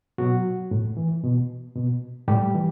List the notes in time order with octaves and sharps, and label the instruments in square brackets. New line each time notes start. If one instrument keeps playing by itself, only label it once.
[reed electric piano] B2 F#3 F#4
A2
E3
B2
B2
A2 G3 G4
E3